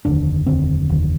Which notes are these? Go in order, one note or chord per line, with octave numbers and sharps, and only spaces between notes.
F1 D#2 D3 D4
F1 D#2 D3 C4
F1 D#2 D3